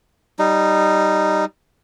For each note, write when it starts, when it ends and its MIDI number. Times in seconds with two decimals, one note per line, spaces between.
0.39 1.45 55
0.39 1.45 63